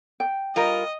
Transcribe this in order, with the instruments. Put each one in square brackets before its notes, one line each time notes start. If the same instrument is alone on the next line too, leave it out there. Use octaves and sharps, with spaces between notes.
[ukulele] G5
[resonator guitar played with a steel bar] G3 F4 A#4 [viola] D#5